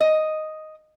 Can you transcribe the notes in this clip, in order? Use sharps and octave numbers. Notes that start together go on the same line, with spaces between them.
D#5